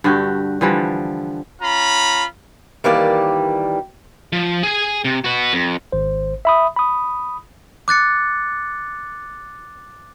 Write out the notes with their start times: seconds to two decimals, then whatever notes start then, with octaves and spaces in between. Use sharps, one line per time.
0.04 G2 D3 F#4 G4
0.61 D3 E3 F3 G3
1.62 C#4 F4 A#5 B5
2.84 D#3 E3 G3 A#3 G4 D5
4.33 F3
4.63 G#4 G#5
5.05 C3
5.24 F#4 B4
5.53 F2
5.92 G#1 C5
6.45 E5 B5 D#6
6.76 B5 D#6
7.88 D6 F#6 A6 C#7